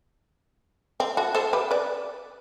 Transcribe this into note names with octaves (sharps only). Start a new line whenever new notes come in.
C4
F#4 A4
A4 C5
G4 B4
B4 D5